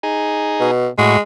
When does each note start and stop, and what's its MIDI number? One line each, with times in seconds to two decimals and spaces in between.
0.03 0.71 63
0.03 0.71 68
0.60 0.88 47
0.98 1.17 45
0.98 1.20 56
0.98 1.17 66